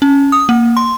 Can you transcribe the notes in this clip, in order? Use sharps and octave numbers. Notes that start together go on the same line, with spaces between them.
C#4
D#6
A#3
C6